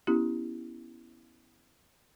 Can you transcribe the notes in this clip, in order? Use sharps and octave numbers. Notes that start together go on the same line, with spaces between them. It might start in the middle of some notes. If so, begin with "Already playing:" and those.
B3 C#4 E4 G4